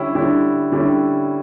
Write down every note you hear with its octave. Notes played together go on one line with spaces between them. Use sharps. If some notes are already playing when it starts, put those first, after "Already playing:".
Already playing: D3 G3 C#4 E4
D3 G3 C#4 E4
D3 G3 C#4 E4